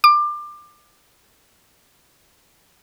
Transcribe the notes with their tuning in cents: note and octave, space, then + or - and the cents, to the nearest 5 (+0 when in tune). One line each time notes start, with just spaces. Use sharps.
D6 +25